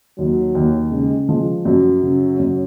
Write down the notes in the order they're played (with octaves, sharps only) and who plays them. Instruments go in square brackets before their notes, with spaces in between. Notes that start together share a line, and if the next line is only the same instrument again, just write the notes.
[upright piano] D#2 [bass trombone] F#3
[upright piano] D#2
[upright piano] C#3 [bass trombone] G#3
[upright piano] F3 [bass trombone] G#3
[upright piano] F#2 [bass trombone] F#3
[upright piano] C#3
F#2